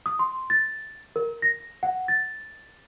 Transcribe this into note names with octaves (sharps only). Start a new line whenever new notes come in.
D#6
C6
A6
A#4
A#6
F#5
A6